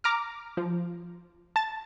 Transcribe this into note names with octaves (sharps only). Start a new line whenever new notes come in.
A#5 D6 F6
F3
A5 A6